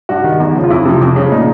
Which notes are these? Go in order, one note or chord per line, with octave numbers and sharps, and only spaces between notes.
G2 F#4
D#3
E2
C#3 F3
F4
F2 E4
C3 F3
F2
C#3 F3
A#2 D#4